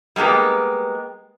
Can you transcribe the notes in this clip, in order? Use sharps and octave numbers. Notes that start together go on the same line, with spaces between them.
G3 G#3 A#3 B3 G4